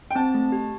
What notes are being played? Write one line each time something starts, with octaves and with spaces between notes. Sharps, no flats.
G5
C4 A5
A3
G4